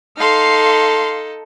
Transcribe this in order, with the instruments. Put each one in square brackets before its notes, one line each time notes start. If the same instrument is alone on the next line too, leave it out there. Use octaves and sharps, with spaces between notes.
[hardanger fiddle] D#4 A4 [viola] F5 C6